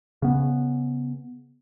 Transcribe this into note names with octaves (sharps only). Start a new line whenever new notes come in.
C#3 B3